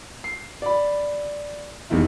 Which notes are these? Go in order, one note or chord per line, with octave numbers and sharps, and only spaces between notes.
C7
D5 B5
F1 E2 D#3 E4